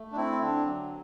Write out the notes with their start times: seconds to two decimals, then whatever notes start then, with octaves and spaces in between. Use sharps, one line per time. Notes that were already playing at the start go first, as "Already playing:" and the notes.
Already playing: A3
0.12 D4
0.17 C4 E4
0.42 D3 D4
0.65 F#3